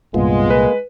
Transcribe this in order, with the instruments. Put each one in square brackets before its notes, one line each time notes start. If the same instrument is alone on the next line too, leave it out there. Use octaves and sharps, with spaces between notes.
[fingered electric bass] C2 A#2 [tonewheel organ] G2 B3 F4 [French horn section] G#3
[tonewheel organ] A#3 [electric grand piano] B4